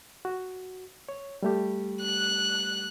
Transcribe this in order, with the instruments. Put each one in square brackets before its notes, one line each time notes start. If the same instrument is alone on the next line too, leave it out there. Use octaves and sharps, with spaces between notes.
[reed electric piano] F#4
C#5
G3 A3 G4
[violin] F#6